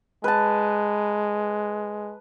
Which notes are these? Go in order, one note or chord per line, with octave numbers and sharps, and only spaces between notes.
G#3 B4 A5